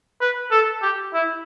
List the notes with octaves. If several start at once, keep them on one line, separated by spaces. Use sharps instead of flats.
B4
A4
G4
E4